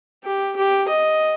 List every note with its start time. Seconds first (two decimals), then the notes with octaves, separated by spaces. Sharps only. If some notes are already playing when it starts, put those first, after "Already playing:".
0.24 G4
0.56 G4
0.88 D#5